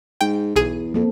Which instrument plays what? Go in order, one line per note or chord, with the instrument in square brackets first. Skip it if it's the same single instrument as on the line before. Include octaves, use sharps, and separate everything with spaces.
[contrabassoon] G#2 [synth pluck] G5
[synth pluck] B1 G#4 D#7 [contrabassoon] E2
[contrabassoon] F2 [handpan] A#3 C4 A4